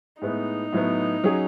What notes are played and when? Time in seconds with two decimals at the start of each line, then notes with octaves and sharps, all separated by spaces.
0.22 A2 G#3 B3 D#4
0.73 A2 F#3 B3
1.24 F#3 C#4 G#4